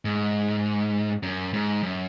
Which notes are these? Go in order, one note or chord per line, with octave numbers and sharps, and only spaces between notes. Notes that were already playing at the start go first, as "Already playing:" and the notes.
G#2
F#2
G#2
F#2